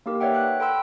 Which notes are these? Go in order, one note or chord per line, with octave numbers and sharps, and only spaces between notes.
A#3 D#4 G4 A#4
B4 C#5 D5 E5 F#5 G5
F#6
A4 G5 B5 C6 E6 D7